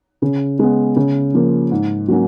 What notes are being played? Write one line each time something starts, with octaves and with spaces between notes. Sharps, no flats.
C#3
G#3 B3
C#3
F3 A#3
G#2
F#3 A#3 C#4 F#4